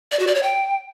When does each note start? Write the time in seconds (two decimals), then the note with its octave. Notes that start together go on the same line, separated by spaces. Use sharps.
0.12 D5
0.19 F#4
0.27 D5
0.35 C#5
0.43 G5